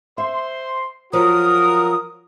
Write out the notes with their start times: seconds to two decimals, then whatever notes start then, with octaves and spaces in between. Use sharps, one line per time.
0.18 C5 E5 C6
1.13 F3 F#3 F#4 A#4 D#6